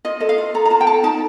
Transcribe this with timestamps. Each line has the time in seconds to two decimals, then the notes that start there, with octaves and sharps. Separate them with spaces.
0.05 F4 D#5
0.20 A4 D#5
0.29 F5
0.38 F4
0.54 A4 A#5
0.66 A#5
0.70 F4 A5
0.81 G5
0.87 A4 A5
1.03 D#4 A5